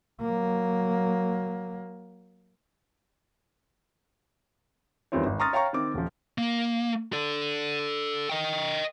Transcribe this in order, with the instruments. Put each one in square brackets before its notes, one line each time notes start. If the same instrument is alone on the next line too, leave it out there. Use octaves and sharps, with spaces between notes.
[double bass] F#3 A#3
[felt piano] E2 D#3 G3 C4 F4 C#5
G#1
A#5 C6 C#6 D#6 F6 A6
C#5 F5 G5 A#5 C#6
D#3 C4 D6
D#1 F3
[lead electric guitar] A#3
A4 D5
D#5 G5